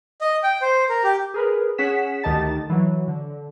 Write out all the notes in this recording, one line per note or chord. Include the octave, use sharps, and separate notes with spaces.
D#5
G5
C5
A#4
G4
G#4 A#4 B4
C#4 G#4 F#5 B6 E7
D2 D#3 G4 D#5 A5 A6
E3 F#3
D3